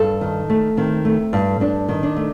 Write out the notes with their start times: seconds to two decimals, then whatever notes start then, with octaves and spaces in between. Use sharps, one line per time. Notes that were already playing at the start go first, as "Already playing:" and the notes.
Already playing: G2 A4
0.21 D#3
0.50 A3
0.77 D#3 C4
1.05 A3
1.33 G2
1.60 G2 D4
1.89 D#3
2.03 D4
2.16 A3